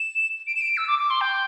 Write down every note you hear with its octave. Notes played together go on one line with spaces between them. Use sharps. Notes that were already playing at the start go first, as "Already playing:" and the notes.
Already playing: E7
D7
E7
D7
E6
D6
D6
C6
G5